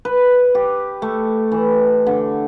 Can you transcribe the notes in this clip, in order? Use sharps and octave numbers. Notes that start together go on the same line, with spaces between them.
B4
G4
A3
E3
D3